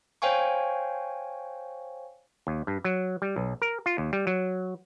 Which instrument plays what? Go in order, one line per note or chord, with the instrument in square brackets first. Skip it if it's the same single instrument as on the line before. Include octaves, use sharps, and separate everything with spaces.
[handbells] C5 C#5 F5 G5 G#5 C#6
[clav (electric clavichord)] D#2
G2
F#3
G3
B1
A#4
F4
D#2
G3
F#3